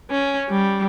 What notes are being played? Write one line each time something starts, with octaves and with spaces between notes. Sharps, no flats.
C#4
G3